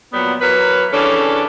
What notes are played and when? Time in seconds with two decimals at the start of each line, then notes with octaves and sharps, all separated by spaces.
0.13 A#2 F#3 G3 B3
0.41 E3 F#3 A#4 B4
0.93 C#3 E3 G3 C#4 D4 A4